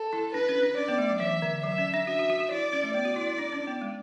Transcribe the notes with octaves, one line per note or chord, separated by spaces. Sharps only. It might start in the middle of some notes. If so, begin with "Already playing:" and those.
Already playing: A4
E4
D4 B4
C#4
D4
C#4 D5
B3
A3
F#3
E3 E5
D3
F#3 E5
C#4
D4
F#4 E5
F#4
F#4
F#4
E4 D5
C#4
A3
B3 D5
F#4
E4
E4
D4
C#4
B3
G#3